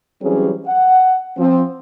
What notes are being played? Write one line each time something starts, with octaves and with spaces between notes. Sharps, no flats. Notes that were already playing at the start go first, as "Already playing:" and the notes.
E3 F#3 G3 C4 C#4 G#4
F#5
F3 C4